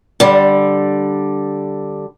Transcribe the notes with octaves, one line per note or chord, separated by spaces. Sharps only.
D3 G3